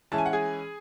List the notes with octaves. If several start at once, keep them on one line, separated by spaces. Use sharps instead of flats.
E3 G#3 C#4 E4 A5
G#5
F#5
G#4 G#5